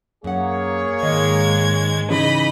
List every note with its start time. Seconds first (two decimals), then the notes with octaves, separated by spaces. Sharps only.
0.24 F#2 A#3 G#4 C#5 F#5
1.03 G#2 D#3 G#3 D#5 G#6
2.10 C#3 E3 D#4 D#5 B5